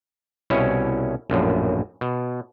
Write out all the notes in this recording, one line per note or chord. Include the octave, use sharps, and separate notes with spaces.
C2 B2 C#4 E4 C#5
A#1 F#2 A2
B2